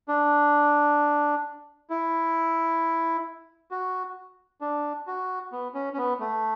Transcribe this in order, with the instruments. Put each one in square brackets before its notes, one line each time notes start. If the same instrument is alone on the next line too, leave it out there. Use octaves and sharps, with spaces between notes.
[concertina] D4
E4
F#4
D4
F#4
B3
C#4
C#4
B3
A3